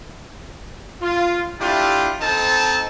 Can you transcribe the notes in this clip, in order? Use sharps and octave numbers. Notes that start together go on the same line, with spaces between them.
F4
A3 D4 E4 F4 G4 G5
C4 D#4 A4 A5